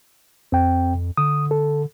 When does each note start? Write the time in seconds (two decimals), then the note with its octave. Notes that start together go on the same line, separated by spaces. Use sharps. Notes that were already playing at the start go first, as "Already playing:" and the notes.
0.52 F2 C4 G5
1.17 D3 D#6
1.51 A4